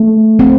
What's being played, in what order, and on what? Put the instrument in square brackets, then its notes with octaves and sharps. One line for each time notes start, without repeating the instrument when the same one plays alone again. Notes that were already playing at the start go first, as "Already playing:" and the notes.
Already playing: [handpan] A3
C4